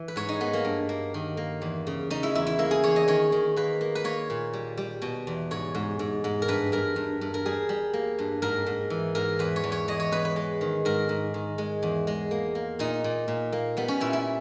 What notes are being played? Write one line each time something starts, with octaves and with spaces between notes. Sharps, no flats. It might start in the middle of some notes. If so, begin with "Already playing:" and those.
Already playing: E3
B4
G#2 C#5
D#4
A#3 B3
A#3
G2
A#3
D#3
A#3
E2
C#3
C#3 D#4
E4
E2 E4
E4
A#3 E4
G#4
E2 C#5
D#5
D#3 C#5
D#3
A#3 B4
A#3
B4
A#3 C#5
A#2
G3
G3
B2
E2
G#2 C#5
G#2
G#2
G#2
A#4
G2 B4
G2 A#4
G2
G2
A#4
G3 G#4
G3
A#3
G2
G#2 A#4
G#2
E3
G#2 A#4
E2 B4
C#5
E2
C#5
E2 D#5
C#5
E2 B4
B4
G#3
D#3
G#2 A#4
G#2
D#3
G#3
E2
G#3
A#3
A#3
A#2 D#4
A#2
A#2
A#3
G3 B3
C#4
A#2 E4
E4